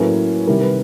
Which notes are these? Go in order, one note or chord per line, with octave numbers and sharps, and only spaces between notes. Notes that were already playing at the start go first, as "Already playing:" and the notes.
Already playing: A2 F#3 A#3 C#4 A4 B4
C3 D#3 G3 A#4
B4